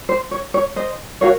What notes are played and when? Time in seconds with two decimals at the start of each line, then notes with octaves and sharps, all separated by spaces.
0.09 C5
0.31 C#5
0.54 C#5
0.76 C5 D#5
1.21 F#4 A#4 C#5 F5